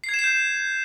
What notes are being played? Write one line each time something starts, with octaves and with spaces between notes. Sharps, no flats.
C7
G#6
E7
C7
G6